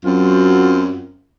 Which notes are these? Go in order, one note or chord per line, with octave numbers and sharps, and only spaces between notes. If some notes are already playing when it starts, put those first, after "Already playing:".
F#2 F#3 C4 F4